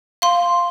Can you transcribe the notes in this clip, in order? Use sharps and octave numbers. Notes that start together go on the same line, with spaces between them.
F5 C6